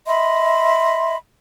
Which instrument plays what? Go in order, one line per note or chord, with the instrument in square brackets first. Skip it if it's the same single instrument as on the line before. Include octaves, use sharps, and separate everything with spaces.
[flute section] D#5 E5 B5 C6